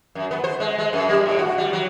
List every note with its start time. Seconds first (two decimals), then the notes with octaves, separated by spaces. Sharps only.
0.15 F#2
0.31 B3
0.44 C5
0.60 G#3
0.78 G#3
0.93 F#2
1.09 G3
1.26 A2
1.39 F#4
1.58 G3
1.73 F#3